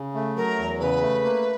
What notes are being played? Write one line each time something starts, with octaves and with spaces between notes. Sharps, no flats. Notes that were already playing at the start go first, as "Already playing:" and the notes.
Already playing: C#3
A3
F#3 A#4
E2
C#3 B4
A3
A#3